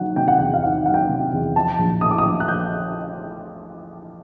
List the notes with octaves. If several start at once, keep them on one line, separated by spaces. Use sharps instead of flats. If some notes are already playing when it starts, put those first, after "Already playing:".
Already playing: D#3 F#3 F#5
C3 G5
F#5
E2 G5
F5
D#3 F#5
F#3 F#5
G5
C3
E2
F3 A5
A#1
A2 D#6
D6
D#6
A#1
F#6
F3 G6